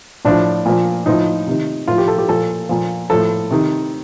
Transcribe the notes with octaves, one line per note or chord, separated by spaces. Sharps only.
A2 F3 D4
A#2 F3
A2 F3 D#4
C3 D#3
A2 F3 F4
G4
A4
G4
A#2 F3 A4
A#2 F3
A2 F3 A4
C3 D#3